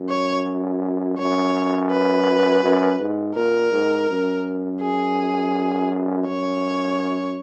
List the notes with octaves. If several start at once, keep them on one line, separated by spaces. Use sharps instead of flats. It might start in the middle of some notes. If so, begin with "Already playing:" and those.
Already playing: F#2
C#5
F#2 C#5
B4
F#2
G#2
A#2 A#4
G#2
F#2
G#4
F#2 C#5